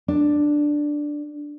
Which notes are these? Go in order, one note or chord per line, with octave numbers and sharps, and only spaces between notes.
D4